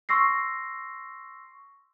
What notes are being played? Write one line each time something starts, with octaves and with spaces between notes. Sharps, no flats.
C6 C#6 E6 A#6 C7